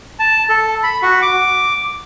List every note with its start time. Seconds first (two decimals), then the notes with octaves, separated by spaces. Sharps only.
0.19 A5
0.49 A4
0.83 B5
1.02 F#4
1.22 D6